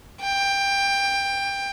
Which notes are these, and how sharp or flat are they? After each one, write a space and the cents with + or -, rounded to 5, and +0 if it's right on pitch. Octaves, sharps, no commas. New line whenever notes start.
G5 +15